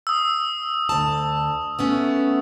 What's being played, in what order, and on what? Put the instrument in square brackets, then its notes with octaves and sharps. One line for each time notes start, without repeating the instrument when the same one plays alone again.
[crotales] D#6 E6
[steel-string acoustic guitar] D2 A5
A3 B3 C#4